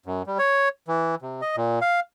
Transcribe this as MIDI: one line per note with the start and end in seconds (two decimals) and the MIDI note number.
0.06 0.23 42
0.27 0.38 55
0.39 0.69 73
0.88 1.15 52
1.22 1.41 48
1.42 1.56 75
1.57 1.79 46
1.81 2.00 77